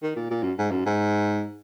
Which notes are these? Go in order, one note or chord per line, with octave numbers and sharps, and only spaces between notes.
D#3
A#2
A#2
F#2
G#2
F#2
G#2